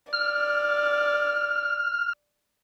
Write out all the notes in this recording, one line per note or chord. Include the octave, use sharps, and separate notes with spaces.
D5 F6